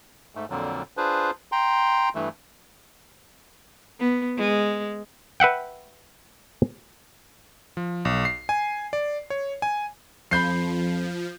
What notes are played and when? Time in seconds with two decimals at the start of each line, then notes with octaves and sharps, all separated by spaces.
0.35 G#2 A3
0.50 F2 A#2 D3 F#3
0.97 D4 F4 G#4 B4 C5
1.52 G5 A#5 C6
2.15 G2 E3 A3
3.99 B3
4.38 G#3
5.40 B4 E5 F#5 G5
7.77 F3
8.05 B1
8.25 C7
8.49 G#5
8.93 D5
9.30 C#5
9.62 G#5
10.31 F2 F3 B5 G6 C7